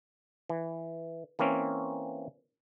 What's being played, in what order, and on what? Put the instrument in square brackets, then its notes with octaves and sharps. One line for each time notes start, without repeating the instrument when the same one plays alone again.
[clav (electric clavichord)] E3
E3 A#3 C4 C#4